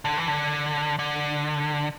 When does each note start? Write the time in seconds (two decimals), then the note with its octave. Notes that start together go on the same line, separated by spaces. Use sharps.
0.05 D3
0.17 E3
0.28 D3
0.99 D3